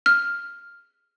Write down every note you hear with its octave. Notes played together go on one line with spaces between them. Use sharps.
F6